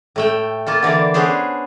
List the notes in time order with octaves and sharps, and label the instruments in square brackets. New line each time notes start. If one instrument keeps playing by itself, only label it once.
[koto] A2 A3 G5
A#3 F4 A4
D3 E3 A#4 D5
B3 C#4 D4 G#4 C5